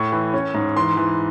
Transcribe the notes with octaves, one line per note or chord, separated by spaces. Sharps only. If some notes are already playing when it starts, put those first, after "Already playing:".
Already playing: A2 C#6
E3
C#4
G#2
E3 C6
E3